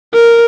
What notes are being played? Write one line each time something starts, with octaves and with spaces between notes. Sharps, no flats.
A#4